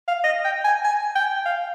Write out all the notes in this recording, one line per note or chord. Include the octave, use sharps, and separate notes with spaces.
F5
D#5
G5
G#5
G#5
G5
F5